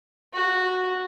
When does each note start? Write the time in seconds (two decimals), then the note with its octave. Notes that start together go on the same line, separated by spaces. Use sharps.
0.33 F#4